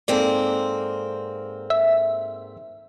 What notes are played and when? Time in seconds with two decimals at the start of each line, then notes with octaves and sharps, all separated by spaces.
0.08 G#2 A#3 C4 A4 D5
1.70 E5